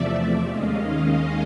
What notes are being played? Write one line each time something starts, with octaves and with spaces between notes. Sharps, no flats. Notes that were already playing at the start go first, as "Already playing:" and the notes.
Already playing: E2 C3 F3 A3 D5 E5
D#2 D#3 G#3 C#4 D#5 F5